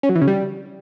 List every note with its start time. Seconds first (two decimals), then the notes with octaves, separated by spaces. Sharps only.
0.03 C#4
0.09 F#3
0.15 E3
0.21 C#3
0.28 G3